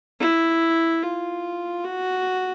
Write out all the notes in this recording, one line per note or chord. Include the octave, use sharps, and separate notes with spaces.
E4
F4
F#4